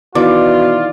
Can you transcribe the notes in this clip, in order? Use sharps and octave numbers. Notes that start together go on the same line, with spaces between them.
B2 D#3 E3 F4 D5 D6